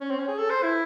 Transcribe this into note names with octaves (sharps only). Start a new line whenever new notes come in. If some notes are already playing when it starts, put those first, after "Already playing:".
C#4
C4
C#4
G#4
A4
C5
E4